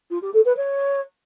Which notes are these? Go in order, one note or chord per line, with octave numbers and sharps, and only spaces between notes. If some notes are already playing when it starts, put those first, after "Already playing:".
F4
G4
A4
B4
C#5